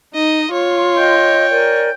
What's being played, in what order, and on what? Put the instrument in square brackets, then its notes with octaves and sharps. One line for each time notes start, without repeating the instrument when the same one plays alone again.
[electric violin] D#4 [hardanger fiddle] D#5
[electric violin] F4 C6 [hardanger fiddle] C#5
[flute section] D#5 [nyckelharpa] G5
[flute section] A#4 D5 G#5